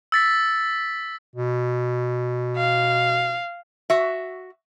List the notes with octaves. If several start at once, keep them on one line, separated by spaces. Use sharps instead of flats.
E6 A6 B6
B2
F5
F#4 E5